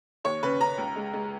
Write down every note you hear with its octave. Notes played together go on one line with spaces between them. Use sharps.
D#2 C#5
C#3 B4
C#3 A#5
C#2
G#3
G#3